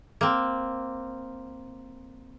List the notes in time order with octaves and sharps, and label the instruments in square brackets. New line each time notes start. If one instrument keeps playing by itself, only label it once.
[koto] A#3 C4